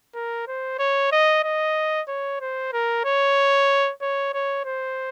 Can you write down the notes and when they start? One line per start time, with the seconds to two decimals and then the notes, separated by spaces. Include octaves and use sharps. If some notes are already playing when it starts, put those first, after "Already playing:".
0.15 A#4
0.47 C5
0.79 C#5
1.12 D#5
1.43 D#5
2.08 C#5
2.41 C5
2.72 A#4
3.05 C#5
4.01 C#5
4.33 C#5
4.65 C5